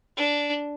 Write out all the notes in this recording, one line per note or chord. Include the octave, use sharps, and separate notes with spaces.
D4